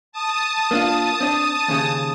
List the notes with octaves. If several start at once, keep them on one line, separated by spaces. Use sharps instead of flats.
A5 D#6
A#3 D4 F4
C4 D4
D#2 C#3